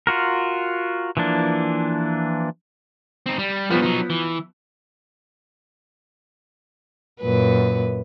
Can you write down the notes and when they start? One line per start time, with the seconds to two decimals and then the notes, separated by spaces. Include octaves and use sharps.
0.07 F4 F#4 A#4
1.17 E3 F3 A#3 D4
3.26 C4 D#4
3.39 G3
3.70 F3 G3 B3 C#4
3.82 F#3 D#4
4.10 E3
7.21 F#2 A#2 B4